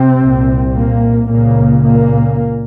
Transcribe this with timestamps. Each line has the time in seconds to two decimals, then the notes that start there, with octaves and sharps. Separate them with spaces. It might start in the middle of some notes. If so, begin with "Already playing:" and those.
Already playing: C3 C4
0.20 C2 A#2
0.74 A#2 A#3
1.29 C#2 A#2 C#3 A#3
1.83 A#2 A#3